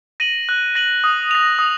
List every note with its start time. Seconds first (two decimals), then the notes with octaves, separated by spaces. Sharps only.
0.20 A#6 D#7 F#7
0.49 F#6
0.75 A#6 D#7 F#7
1.04 D#6
1.31 A#6 F7
1.59 D#6